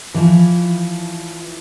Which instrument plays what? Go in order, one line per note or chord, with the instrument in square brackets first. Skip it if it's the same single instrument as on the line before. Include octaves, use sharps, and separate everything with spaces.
[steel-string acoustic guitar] E3 F3